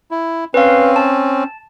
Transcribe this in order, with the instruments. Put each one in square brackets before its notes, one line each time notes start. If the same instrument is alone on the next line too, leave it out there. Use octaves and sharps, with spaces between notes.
[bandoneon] E4
[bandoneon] C4 C#4 [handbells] B4 F5
[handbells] A5